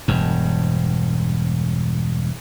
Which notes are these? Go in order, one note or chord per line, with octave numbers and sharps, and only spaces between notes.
E1 G2